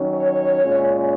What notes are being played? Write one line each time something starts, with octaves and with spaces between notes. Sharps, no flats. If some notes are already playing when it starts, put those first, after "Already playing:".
Already playing: D#3 F#3 C#4
C#5
A#2 G#3 C#4